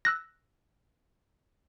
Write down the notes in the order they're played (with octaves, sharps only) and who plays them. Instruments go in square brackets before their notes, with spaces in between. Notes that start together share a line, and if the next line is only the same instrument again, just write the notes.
[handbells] E6 F#6 A#6